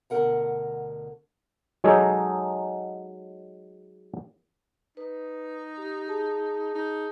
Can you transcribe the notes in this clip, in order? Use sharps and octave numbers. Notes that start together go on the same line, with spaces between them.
D2 B2 D3 A#4 F#5 A#5
F#3 G#3 D#4 G#4 A4 C#5
D#4 B4
G4
G#4 A5
D#4